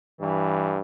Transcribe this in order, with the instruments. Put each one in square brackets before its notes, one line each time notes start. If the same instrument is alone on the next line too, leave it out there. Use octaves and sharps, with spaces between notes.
[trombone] G2 [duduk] E3